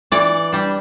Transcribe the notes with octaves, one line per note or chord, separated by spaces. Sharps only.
E3 D5
G3 D4